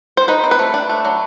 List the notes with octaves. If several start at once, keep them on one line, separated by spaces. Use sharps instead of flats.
C5
D#4 B4
C4
B4
A3
D4
A3
F#3